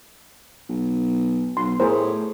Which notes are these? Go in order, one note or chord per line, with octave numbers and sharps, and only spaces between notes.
B1
B1 C6
A2 G#4 A#4 C5